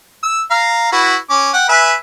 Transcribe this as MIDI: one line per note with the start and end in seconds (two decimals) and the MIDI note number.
0.23 0.40 88
0.51 0.91 77
0.51 0.91 82
0.92 1.15 64
0.92 1.15 66
0.92 1.15 71
1.30 1.51 61
1.30 1.51 86
1.53 1.66 78
1.53 1.66 79
1.69 1.93 71
1.69 1.93 76
1.69 1.93 80